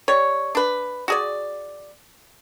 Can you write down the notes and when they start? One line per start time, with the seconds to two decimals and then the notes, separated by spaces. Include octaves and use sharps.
0.08 G3 C#5
0.55 D4 B4
1.08 F#4 G#4 D5